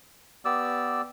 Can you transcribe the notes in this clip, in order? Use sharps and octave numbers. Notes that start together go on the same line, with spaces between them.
B3 G4 D5 E6